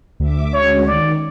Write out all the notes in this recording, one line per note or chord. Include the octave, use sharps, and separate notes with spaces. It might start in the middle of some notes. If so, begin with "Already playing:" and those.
D2 E5 D6
G#3 C#4 F#4 C#5
D#3 D5